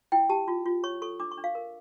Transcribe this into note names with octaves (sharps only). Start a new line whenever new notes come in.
E4 G5
G4 A5
F4
F4
C#5 C#6
A4 C#6
D4 D6
C#6
D4
F5
A#4